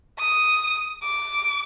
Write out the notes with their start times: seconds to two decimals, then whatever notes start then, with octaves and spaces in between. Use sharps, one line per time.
0.18 D#6
1.03 D6